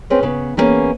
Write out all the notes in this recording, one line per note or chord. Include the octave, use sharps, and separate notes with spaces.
C4 C#4 G#4 B4 C#5
C#3 B3
E3 G3 A#3 B3 C#4 G#4